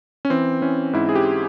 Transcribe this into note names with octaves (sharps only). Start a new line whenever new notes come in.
C#4
E3 C4
E3 C#4
G#2 E4
G#4
G4